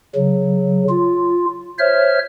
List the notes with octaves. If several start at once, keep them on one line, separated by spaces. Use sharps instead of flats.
C#3 F#3
F4
C5 C#5 E5 F6